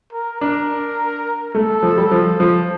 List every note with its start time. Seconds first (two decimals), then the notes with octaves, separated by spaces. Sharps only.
0.13 A#4
0.41 D4 A#4
1.55 A3 A4
1.83 F3
1.97 G3
2.11 F3
2.40 F3